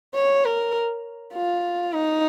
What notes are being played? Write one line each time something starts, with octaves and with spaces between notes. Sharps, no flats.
C#5
A#4
F4
D#4